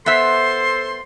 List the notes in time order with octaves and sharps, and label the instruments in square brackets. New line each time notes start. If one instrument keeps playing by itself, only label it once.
[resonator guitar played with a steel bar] B3 E5 [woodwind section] A4 C5 C6